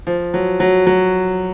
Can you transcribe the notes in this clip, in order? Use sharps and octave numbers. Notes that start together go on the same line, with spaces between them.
F3
F#3
F#3
F#3